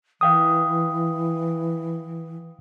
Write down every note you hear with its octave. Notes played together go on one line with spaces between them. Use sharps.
E3 F5 G5 D#6